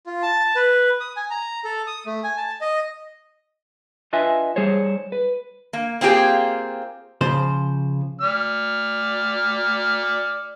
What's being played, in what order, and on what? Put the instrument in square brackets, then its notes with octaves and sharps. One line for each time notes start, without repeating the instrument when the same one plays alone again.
[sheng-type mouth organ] F4
A5
B4
D#6
G#5
A#5
A4
D#6
A3
G#5
A5
D#5
[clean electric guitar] D4 F4 B4 D#5 E5 G#5
G3 G#4 C5 C#5
B4
[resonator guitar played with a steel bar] A#3
A#3 C4 F4 G4 G#4
[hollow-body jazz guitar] C#3 F3 C5
[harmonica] D5 F6